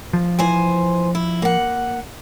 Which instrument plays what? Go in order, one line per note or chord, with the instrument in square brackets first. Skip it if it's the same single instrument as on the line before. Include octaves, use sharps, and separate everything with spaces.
[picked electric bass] F3
[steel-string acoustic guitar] E3 C5 G#5
E4
A#3 F#5